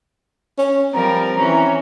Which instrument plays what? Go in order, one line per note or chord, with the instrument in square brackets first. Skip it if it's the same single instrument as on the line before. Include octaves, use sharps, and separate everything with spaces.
[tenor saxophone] C#4
[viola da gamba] F3 G3 A#4 [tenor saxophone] C4 [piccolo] A#5
[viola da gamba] E3 C#4